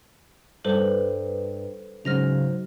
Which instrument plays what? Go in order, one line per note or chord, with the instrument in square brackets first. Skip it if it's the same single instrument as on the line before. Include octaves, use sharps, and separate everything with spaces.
[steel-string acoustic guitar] G2 [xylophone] A4 B4 C5
[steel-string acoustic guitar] G#2 [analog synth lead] C#3 [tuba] F#3 [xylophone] F6 A#6 F7